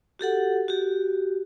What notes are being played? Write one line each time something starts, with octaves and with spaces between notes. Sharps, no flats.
F#4 G4 A4 F#5
F#4 G4